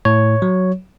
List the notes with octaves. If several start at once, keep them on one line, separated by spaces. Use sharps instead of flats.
A2 C#5
F#3